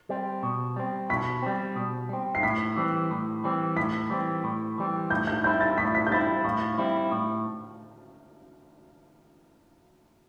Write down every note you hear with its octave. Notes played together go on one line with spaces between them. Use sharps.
G3 C4
B2
G3 C4
B2 B6
G3 C4
B2
G3 C4
C7
A2 B6
E3 G3 C4
A2
E3 G3 C4
A2 B6
E3 G3 C4
A2
E3 G3 C4
A2 G6
G6
G3 C4 E4 G6
A6
A2 B6
B6
G6
G3 C4 E4 A6
A2 F5
G3 C4 E4
A2